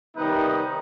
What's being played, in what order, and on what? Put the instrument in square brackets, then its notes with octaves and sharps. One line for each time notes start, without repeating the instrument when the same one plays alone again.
[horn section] C3 D#3 G3 B3 D#4